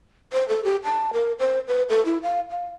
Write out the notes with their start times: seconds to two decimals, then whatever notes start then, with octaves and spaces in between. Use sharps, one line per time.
0.33 C5
0.49 A4
0.65 G4
0.84 A5
1.13 A#4
1.39 C5
1.68 B4
1.89 A4
2.05 E4
2.23 F5
2.50 F5